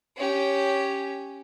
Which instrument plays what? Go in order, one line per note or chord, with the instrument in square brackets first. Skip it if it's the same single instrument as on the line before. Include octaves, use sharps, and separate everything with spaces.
[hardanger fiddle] C#4 G4